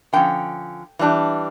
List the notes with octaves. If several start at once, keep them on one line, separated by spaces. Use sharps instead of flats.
D3 F3 C#4 G5
E3 G3 D4